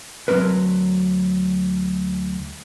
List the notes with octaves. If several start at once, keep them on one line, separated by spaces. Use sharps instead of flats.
D2 F#3 B3 C4 A#4 B4